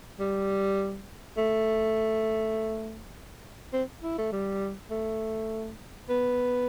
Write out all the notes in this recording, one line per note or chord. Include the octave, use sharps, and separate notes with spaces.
G3
A3
C4
E4
A3
G3
A3
B3